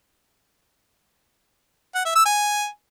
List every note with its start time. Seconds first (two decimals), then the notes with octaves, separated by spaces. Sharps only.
1.95 F#5
2.05 E5
2.15 E6
2.26 G#5